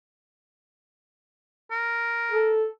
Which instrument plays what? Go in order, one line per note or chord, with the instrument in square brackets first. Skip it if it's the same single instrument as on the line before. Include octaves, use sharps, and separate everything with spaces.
[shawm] A#4
[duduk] A4